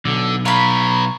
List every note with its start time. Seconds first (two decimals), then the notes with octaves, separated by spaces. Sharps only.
0.05 B1 D3
0.45 B4 C#5 F5 A#5 B5